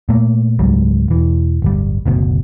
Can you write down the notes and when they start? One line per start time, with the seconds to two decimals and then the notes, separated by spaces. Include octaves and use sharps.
0.09 A#2 A3 A#3
0.59 C#2 G#2 F#3 G3
1.08 E1 E3
1.62 D1 G1 G3
2.06 F#1 D2 B2